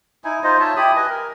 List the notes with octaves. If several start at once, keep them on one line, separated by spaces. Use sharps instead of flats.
D#4 E4 G#5
D#4 F4 C5 D#5
F4 C#5 E5 A5
E4 G4 B5 D#6
B4 D#5 G#5
A#4